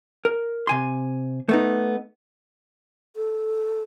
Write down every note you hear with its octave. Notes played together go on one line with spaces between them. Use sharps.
A#4
C3 G#5 C6
A3 B3 D#4
A4